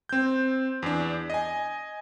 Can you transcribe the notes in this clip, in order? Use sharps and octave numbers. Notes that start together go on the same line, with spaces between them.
C4 G6
E2 D4
D#5 G#5